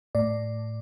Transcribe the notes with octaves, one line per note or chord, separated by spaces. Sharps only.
A2 D5